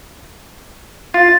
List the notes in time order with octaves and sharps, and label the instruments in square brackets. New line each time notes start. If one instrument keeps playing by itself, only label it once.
[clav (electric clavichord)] F4 [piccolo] A6